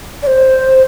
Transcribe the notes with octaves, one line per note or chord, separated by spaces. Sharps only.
D5
C5